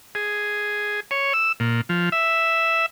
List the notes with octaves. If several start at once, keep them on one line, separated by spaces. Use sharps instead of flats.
G#4
C#5
E6
A#2
F3
E5